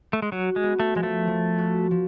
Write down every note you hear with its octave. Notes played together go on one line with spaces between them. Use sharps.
A3
G#3
F#3 F#4
G#3
B3
A3
F3 G#3
A3
F3
F#4
F3